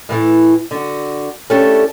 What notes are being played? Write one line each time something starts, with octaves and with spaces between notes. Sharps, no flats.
A2 E3 A3
D3 F#4
A3 C#4 D4 E4 G4 A4